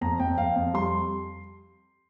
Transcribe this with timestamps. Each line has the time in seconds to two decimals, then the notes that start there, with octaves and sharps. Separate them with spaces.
0.01 F2 A#5
0.19 F2 G5
0.37 F2 F5
0.56 F2
0.74 G3 C6